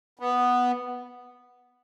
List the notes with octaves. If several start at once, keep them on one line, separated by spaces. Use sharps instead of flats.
B3